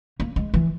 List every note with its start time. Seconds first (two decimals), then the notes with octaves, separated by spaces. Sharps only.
0.20 A#3
0.36 G#3
0.54 E3